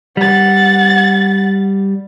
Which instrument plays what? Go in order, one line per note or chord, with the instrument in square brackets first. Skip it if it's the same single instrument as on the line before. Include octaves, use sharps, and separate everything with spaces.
[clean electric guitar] G3 [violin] F#5 A6